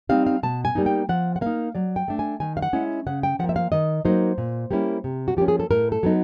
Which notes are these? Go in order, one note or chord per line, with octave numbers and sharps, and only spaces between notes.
G3 C4 D#4 F5
F5
B2 A5
G#5
G3 A#3 D#4
G5
F3 F#5
F#5
A#3 D#4 F5
F#3 D5
G5
A3 D4
G#5
D#3 G#5
F5
F#5
G#3 C#4 E4
C#3 F#5
G5
F3 A#3 F#5
E5
F5
D#3 D#5
F#3 A#3 D#4 C5
A#2
G3 A#3 C#4 E4
C3
F#4
F3 A#3 C#4 G4
G#4
A4
A2 A#4
A4
F#3 B3 D#4